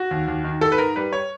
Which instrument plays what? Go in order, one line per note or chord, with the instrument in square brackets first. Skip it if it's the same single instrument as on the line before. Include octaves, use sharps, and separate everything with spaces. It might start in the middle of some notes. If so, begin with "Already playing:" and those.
Already playing: [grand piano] F#4
D#2
D#2
D#3
G#2 A4
B4
G#2 A#4
G3 B4
C#5